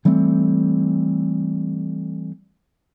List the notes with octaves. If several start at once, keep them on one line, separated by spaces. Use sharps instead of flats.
E3 G3 A3 C4